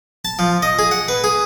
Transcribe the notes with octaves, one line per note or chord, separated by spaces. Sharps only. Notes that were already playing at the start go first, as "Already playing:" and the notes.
A5
F3
D#5
G#4
F#5
B4
G#4